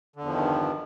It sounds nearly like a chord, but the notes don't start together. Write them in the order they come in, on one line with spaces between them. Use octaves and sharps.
D3 E2 F3 D#3 G2